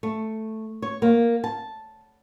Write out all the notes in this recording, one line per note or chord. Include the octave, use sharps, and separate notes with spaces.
A3
C#5
A#3
A5